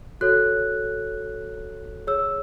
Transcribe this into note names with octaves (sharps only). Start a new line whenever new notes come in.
F#4 A4 C#5 F#6
G#4 C#5 E6